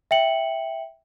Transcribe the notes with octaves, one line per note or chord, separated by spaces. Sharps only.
E5 G5 C#7 F#7